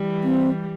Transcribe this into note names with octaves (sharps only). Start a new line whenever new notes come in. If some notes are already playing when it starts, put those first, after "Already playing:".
Already playing: E3 G3
C4